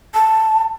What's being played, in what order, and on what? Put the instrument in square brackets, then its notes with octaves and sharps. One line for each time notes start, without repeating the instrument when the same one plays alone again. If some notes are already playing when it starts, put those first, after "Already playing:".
[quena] A5